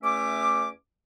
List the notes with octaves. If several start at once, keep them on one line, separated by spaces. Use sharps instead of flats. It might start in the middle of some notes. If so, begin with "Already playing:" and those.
E2 A3 C#4 E5 D6